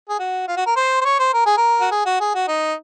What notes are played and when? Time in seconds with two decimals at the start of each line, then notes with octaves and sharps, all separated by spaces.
0.09 G#4
0.19 F#4
0.48 F4
0.57 F#4
0.66 A#4
0.76 C5
1.01 C5
1.05 C#5
1.19 C5
1.34 A#4
1.46 G#4
1.57 A#4
1.80 F#4
1.91 G#4
2.06 F#4
2.20 G#4
2.34 F#4
2.48 D#4